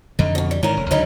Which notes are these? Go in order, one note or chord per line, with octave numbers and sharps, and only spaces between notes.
F2 D3 D#4
B2 D#3
G3
G#2 D#3 E3 C#4 A#4
F1
C#2 D3 F#3 C#4 D#4 B4